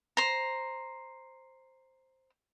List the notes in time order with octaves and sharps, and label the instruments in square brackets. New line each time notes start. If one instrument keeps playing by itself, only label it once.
[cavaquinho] C5 A#5